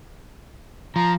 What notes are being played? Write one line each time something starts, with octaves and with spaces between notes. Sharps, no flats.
F3 A#5